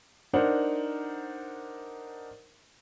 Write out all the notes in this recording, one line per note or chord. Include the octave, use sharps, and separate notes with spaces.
D4 D#4 A#4 C5 F#5